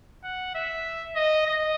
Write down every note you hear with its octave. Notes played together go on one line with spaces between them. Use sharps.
F#5
E5
D#5
D#5